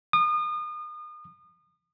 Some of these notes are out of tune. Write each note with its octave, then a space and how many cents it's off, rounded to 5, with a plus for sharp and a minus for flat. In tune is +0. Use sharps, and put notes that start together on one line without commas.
D#6 -35